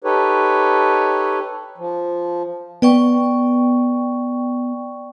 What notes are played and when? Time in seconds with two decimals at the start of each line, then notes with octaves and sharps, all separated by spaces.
0.04 D#4 G4 A4 B4 C#5
1.78 F3
2.82 B3 D5 G5 C#6